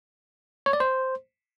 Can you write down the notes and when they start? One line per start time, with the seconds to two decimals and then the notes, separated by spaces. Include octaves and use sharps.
0.66 C#5
0.73 D5
0.80 C5